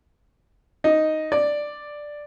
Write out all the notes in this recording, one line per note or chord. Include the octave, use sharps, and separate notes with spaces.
D#4
D5